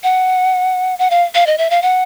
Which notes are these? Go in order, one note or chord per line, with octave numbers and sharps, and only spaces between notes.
F#5
F#5
F5
F5
D#5
E5
F5
F#5